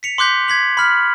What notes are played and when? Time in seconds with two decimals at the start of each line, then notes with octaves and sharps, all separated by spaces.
0.03 B6 C#7 F7
0.18 C6 D6 F#6 G6 B6
0.48 G#6 B6 F#7
0.77 B5 F6 B6